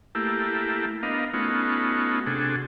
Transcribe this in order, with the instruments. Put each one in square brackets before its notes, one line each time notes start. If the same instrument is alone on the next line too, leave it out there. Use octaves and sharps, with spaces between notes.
[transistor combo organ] A3 A#3 E4 G4
B3 D4 A#4 D#5 F5
A3 B3 C#4 D#4 F4 F#4
C3 D4 F#4 G#4 A4